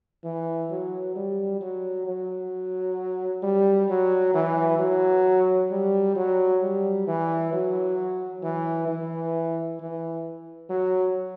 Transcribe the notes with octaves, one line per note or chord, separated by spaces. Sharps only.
E3
F#3
G3
F#3
F#3
G3
F#3
E3
F#3
G3
F#3
G3
E3
F#3
E3
E3
E3
F#3